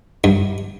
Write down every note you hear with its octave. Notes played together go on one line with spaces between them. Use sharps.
G2